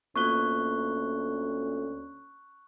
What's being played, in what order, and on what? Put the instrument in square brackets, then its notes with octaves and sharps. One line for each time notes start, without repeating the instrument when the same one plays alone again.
[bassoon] D2 [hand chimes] A#3 B3 F4 [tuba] C#4 [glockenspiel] C#6 F#6 G7